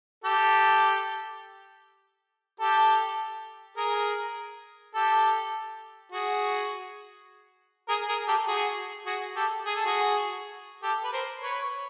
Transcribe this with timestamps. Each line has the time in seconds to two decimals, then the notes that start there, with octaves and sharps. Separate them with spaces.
0.24 G4 A4
2.60 G4 A4
3.77 G#4 A#4
4.95 G4 A4
6.12 F#4 G#4
7.88 G#4 A#4
8.09 G#4 A#4
8.28 G4 A4
8.47 F#4 G#4
9.06 F#4 G#4
9.36 G4 A4
9.66 G#4
9.76 A4
9.86 F#4 G#4
10.83 G4 A4
11.04 B4
11.12 A#4 C5
11.42 B4 C#5